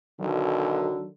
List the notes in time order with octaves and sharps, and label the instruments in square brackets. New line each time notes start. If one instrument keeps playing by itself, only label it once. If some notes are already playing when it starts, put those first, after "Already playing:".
[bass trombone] B1 [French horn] D3 [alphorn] D#3 [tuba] F#3